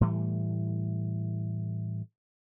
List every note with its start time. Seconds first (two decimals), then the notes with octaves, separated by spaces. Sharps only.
0.01 A2 E3 G3 A3